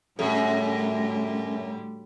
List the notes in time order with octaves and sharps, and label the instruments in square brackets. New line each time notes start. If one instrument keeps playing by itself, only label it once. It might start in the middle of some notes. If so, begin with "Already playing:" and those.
[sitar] F#2 [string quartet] A2 D3 G3 [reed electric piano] C#4 G#4 A4